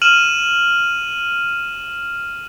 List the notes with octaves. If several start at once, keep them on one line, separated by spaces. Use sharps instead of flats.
F6 D#7 E7 F#7